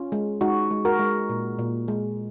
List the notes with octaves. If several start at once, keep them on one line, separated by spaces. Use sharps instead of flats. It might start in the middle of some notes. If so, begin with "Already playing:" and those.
Already playing: C#4 F4
G#3
G#3 D#4 F#4
G#3
F#4 A#4
G#3
A#2
A#2
G#3